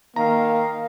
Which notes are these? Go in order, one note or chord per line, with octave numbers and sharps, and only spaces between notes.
D#3 A#3 F5 A#5